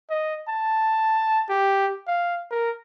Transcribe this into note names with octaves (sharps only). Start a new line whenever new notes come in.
D#5
A5
G4
F5
A#4